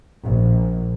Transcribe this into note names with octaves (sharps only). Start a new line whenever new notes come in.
A#1